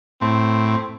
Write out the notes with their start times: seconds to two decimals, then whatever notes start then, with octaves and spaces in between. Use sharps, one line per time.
0.21 A2 C4